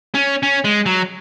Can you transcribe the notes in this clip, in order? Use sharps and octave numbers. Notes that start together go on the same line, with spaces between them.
C#4
C#4
G#3
F#3